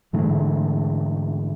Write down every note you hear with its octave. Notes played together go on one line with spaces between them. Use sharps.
G#2 D3 E3 A3